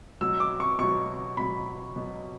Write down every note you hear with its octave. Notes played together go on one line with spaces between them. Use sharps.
B2 F#3 E6
D6
C#6
B2 F#3 C#6
B2 F#3 B5
B2 F#3